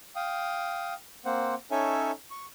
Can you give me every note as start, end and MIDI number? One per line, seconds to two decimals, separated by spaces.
0.16 0.94 77
0.16 0.94 79
0.16 0.94 87
1.25 1.55 58
1.25 1.55 60
1.25 1.55 72
1.25 1.55 78
1.71 2.11 61
1.71 2.11 63
1.71 2.11 69
1.71 2.11 73
1.71 2.11 76
1.71 2.11 80
2.31 2.46 85